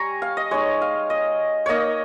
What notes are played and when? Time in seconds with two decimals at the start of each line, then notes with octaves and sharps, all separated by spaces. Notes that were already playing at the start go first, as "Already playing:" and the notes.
Already playing: G3 G#5 A#5 C#6
0.22 F5
0.37 D#5
0.51 G#3 D#4 C#5
0.82 F5
1.10 D#5
1.66 A#3 D#4 C#5 D#5